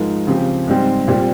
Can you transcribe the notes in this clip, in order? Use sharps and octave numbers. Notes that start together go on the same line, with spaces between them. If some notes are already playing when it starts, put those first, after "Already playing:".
Already playing: G#2 F3 G#3 D#4 A#4
C#3 F3 C4 G4
G#2 G3 C4
A#2 G3 C4